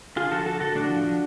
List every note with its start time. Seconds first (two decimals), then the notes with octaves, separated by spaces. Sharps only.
0.16 D3 F4 G#4
0.31 F3 F#4 A4
0.46 D3 F#4 A4
0.60 D3 F#4 A4
0.75 A2 D4 F#4
0.90 F3
1.05 F3